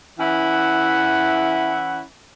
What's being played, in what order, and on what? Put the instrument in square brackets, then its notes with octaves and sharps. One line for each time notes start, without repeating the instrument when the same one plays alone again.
[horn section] E3 C#4 E4 E5 F#5